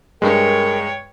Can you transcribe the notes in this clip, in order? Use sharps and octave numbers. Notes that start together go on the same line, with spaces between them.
G2 G#3 A#4 C#5 G5